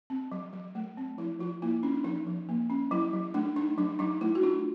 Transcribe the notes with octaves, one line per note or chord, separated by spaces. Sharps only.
C4
F#3
F#3
A3
C4
F3 E4
F3 F4
A#3 E4
C#4 D4
D4
F3 D#4
F3
A#3
C#4
F#3 E4
F#3
A3 D4
D4 D#4
F#3 D4
F#3 D#4
A3 E4
F#4
D4 F4